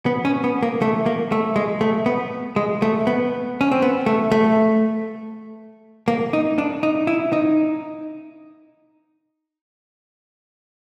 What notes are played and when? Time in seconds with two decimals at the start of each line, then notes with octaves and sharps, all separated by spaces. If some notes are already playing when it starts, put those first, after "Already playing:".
0.06 B3
0.25 C#4
0.44 B3
0.63 A#3
0.82 A3
1.06 A#3
1.32 A3
1.56 G#3
1.81 A3
2.06 B3
2.56 G#3
2.82 A3
3.07 B3
3.61 C#4
3.71 C4
3.82 B3
4.06 A3
4.32 A3
6.08 A#3
6.33 D#4
6.58 D4
6.83 D#4
7.07 E4
7.33 D#4